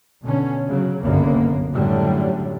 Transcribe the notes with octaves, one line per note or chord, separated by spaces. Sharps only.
B2 D3 C#4
C#3 F#3
F#1 C2 F#2 D3 A#3 B3
F#2 A2 D3 F#3 G3